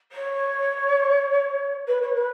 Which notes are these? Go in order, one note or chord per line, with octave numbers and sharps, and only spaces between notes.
C#5
B4
C#5
B4